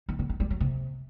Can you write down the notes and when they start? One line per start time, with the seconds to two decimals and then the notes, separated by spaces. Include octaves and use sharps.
0.09 D#3
0.19 D3
0.30 D#3
0.40 G3
0.50 F#3
0.61 C3